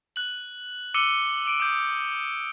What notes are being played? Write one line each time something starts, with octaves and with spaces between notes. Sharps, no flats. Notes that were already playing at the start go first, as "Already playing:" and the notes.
F#6 F#7
D6 E6 C#7 D#7 G7
D6 D7 D#7
D6 D#6 G6